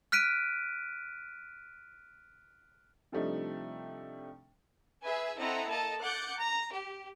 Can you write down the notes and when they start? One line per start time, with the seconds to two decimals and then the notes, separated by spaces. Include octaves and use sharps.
0.12 F6 F#6 B6 D7 D#7
3.12 C3 F3 G3 A3 D4 D#4
5.03 G#4 B4 E5 G#5
5.39 C4 E4 A4 D#5 F#5 A#5
5.69 A#3 A4 D#5 A5 A#5
6.01 F#5 D6 F#6 G6 A6 C#7
6.39 A#5
6.74 G4